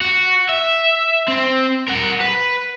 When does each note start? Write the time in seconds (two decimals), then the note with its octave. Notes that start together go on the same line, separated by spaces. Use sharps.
0.01 F#4
0.49 E5
1.28 C4
1.88 A#4 F#5
2.21 B4